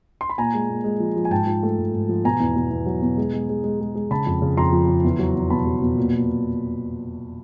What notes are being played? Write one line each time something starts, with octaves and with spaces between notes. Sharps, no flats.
C6
B5
A#2 G#5 A#5
G#3
A#2
G#3
F3
F3
G#5
G#2 G5 A5
F3
A3
G#2
G#2
F3
B2 G#5 A#5
E2
B2
E2
F#3
B2
G#3
G#3
G#3
G#3
G#3
G#3
C#3 A5 B5
F2
C#3
F2 A#5 C6
F3
C#3
E2
F#3
E2
B2 A5 B5
F#3
B2
A#2
A#2